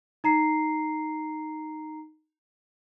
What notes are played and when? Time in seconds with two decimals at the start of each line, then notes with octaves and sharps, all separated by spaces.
0.24 D#4 A#5 C7